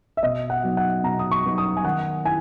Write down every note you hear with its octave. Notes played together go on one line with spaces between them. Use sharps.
E5
B2 D#5
F#5
F#3 B3 D#4
F#5
B2 A#5
D#6
C#6
F#3 B3 D#4
D#6
G#5
D#3 F#5
E4 G#5